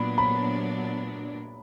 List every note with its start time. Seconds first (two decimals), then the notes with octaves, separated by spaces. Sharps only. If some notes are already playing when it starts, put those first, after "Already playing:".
Already playing: A#2 F#3 B3 D4 B5
0.18 B5